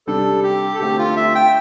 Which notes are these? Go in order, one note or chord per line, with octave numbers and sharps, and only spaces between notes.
C3 G3 D4 A4
G4
A4
D3 A3 C4 G4
F4
E5
G5